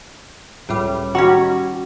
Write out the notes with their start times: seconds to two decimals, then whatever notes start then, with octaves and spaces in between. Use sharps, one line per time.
0.69 C#2 A2 G3
1.15 D#3 G3 C#4 F#4